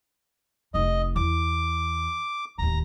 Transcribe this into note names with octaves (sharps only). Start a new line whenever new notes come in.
F1 D#4 D#5
E2 D6
D1 D#2 A#5